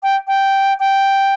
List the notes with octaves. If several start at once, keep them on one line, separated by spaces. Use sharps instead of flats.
G5
G5
G5